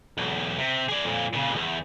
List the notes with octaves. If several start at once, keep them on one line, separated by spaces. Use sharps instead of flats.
B1 E2
C3
G#4 D5
F2 A#2
A#2 C#3
E2 G2